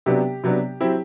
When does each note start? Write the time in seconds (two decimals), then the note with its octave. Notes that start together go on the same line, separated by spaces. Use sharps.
0.06 C3 F#3 B3 D4 G4
0.44 C3 F#3 B3 D4
0.81 F#3 C4 E4 G4